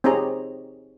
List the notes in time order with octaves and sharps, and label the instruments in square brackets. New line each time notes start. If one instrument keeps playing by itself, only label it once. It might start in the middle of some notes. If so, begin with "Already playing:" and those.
[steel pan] C4 D#4 G4 G#4 C#5 A#5